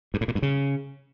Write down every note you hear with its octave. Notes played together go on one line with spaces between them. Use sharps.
G2
A2
A#2
G2
C#3